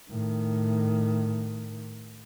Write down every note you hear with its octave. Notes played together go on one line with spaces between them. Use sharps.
A2 D#3